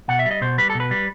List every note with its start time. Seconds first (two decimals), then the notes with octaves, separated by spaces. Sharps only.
0.08 B2 F#5
0.19 E5
0.26 G3
0.31 D#5
0.41 B2 C5
0.58 G3 B4
0.70 B2 A4
0.80 B4
0.91 G3